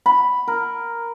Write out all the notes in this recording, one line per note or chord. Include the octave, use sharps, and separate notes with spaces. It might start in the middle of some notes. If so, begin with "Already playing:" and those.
B5
A#4